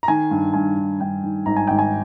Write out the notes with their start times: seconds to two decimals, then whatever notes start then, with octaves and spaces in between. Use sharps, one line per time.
0.03 A#5
0.08 D#3 G#5
0.31 G2
0.54 G2 G#5
0.77 D#3
1.00 G2 G5
1.24 D#3
1.46 G#1 A#5
1.57 G#5
1.67 G#1 G5
1.79 G#5